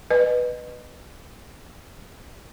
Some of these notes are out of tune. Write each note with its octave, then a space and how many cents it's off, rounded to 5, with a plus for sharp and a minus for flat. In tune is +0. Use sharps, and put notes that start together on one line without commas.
B4 +0 D#5 -25